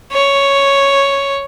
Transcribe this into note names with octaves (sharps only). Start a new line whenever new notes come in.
C#5